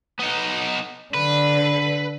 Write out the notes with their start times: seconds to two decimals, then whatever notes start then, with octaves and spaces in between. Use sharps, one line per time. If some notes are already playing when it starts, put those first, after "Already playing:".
0.19 B3 D#4
1.14 D3 B4